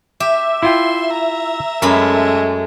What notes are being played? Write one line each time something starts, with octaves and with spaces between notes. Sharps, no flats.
G4 E5
E4 F4 G5 C6
A#5
F#2 G#3 A3 C#4 A#4 B5